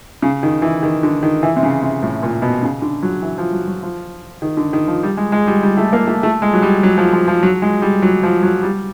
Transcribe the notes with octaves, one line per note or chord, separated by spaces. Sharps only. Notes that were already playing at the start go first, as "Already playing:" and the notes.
C#3
D#3
E3
D#3
D3
D#3
E3
C3
C#3
C3
A2
A#2
B2
C#3
D3
F#3
E3
F3
F#3
F#3
F3
D#3
D3
D#3
F3
G3
G#3
G#3
G3
G3
A3
A#3
A3
A3
G#3
F#3
G3
F#3
F3
F3
F3
F#3
G#3
G3
F#3
F3
F#3
G3